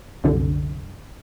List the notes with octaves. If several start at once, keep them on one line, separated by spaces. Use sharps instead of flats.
C2 F#2 D3